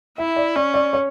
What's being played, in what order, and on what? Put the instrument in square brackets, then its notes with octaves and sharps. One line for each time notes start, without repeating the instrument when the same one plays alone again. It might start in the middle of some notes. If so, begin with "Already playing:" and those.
[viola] E4 [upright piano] E5
[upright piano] D5
[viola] C#4 [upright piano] D5
[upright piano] D5
C#5